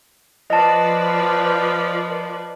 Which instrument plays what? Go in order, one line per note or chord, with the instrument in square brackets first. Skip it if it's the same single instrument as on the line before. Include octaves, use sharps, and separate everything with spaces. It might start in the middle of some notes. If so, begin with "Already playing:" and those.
[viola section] F3 B4 D5 [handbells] D#5 A5